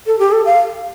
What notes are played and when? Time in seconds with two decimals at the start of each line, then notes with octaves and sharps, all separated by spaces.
0.07 A4
0.19 G4
0.32 A4
0.45 F5